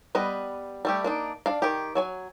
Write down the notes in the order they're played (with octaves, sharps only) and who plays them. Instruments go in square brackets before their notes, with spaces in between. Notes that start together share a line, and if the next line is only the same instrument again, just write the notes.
[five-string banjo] G3 B3 B4 D#5
G3 A3 G4
A#3 D4 D#4
D4 F5
D#3 G4
F#3 C#5 G#5